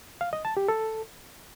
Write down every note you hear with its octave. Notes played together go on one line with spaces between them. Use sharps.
F5
D#5
A5
G4
A4